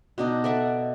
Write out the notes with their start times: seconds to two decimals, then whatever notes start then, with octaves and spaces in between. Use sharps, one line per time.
0.18 B2 D4 D#4
0.44 A4 D5 E5 F#5